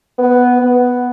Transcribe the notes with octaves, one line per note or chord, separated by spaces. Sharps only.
B3
B3